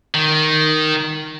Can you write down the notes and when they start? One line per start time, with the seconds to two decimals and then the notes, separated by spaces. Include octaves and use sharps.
0.15 D#3